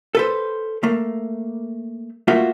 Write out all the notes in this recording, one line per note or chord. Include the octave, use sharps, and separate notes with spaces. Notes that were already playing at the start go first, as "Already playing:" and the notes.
A4 B4 C5
A3 A#3
A3 A#3 F4 F#4 E5